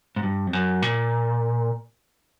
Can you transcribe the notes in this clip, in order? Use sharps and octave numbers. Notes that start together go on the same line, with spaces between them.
G#2
G2
F2
F#2
A#2